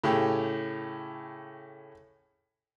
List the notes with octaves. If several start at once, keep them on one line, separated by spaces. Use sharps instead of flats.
A2 C#3 G4